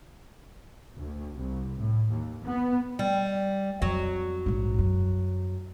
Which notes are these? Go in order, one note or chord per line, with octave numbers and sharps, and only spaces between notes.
D2
C2
A2
D#2
B3
G3
F2 F#3
A#1 G#2
F#2